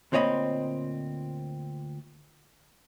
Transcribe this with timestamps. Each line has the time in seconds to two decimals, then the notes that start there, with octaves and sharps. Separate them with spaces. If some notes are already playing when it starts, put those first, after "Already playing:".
0.12 D2 A#2 C4 C#5 D#5 B5